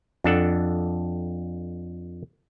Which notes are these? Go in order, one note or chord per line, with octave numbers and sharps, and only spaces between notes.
F2 D4 A4 F#5